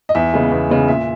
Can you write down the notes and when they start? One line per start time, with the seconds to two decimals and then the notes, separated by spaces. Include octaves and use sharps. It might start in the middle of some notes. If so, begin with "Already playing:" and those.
0.09 D#5
0.15 E2 E5
0.34 C#3 G#3 B3
0.52 E2
0.69 C#3 G#3 B3
0.88 A#2 E5